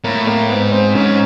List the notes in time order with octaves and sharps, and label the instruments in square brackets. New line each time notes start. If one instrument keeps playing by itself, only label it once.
[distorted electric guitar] A2 [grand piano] A#3
[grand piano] A#3
[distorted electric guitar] G#2 [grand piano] B3
[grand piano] C4
[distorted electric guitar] G#2 [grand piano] C#4